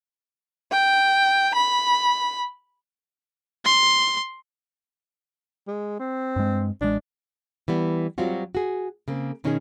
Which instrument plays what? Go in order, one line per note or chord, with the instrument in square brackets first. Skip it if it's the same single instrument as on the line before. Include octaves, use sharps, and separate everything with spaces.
[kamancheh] G5
B5
[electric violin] C6
[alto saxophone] G#3
C4
[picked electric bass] G2 G#3
[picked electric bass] A1 G#3 [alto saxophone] D4
[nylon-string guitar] E3 G3 B3
F#3 G3 C4 F4 F#4
F#4 G#4
C#3 A#3 C4
B2 D#3 C#4 D#4 E4 G#4